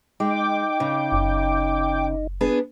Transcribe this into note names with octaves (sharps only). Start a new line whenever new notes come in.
G#3 D#4 G5 D6
C#3
F#1
B3 D4 G#4